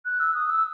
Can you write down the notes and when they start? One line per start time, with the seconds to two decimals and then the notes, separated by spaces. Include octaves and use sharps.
0.05 F#6
0.20 E6
0.34 D#6
0.49 E6